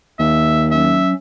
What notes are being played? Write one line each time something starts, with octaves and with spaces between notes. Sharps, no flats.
D#2 E5
F#3 C#4 E5